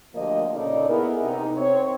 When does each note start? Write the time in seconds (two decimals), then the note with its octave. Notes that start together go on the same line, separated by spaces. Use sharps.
0.15 D2 F3 A#3 G4 D#5
0.54 A#2 C#3 D#4 A4 D5
0.88 B3 E4 G#4 A#4
1.21 C3 D#4
1.57 C4 C#5